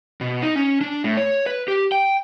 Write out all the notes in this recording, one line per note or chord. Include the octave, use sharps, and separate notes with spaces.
B2
D#4
C#4
D4
A2
C#5
B4
G4
G5